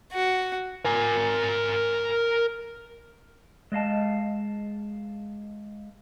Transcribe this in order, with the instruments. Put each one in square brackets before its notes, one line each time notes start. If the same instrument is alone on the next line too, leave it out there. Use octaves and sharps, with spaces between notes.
[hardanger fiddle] F#4
[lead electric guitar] A#4 G#5
[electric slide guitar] G#3 D#5 F5 A5